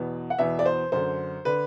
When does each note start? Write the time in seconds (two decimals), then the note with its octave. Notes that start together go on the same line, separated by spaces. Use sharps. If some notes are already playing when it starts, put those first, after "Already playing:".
Already playing: E2 B2
0.30 F#5
0.39 E2 B2 E5
0.59 D5
0.66 C5
0.92 F#2 D3 C5
1.45 D3 B4